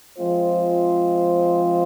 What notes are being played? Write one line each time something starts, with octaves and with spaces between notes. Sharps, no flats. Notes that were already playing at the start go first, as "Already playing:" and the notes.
F3 G#3 C4 F4 C5